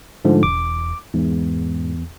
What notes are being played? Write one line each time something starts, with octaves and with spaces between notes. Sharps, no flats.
G#2 D3 F3 A3
E1 D6
E2 G#2